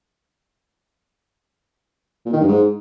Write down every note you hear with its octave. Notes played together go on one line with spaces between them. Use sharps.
A#2
D#3
G2
G#2